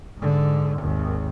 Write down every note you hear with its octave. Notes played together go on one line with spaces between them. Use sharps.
G#2 D3
G#1 D#2